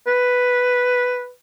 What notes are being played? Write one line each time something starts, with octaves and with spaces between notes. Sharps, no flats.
B4